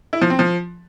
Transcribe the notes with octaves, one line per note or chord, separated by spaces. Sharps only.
E4
F3
C4
F3